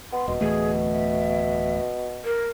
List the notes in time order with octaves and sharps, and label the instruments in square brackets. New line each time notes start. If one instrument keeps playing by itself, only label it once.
[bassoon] B3 [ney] C6
[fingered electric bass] D#1 [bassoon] B2
[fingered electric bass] D1 E3 A3 [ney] G#4
[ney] E5
A#4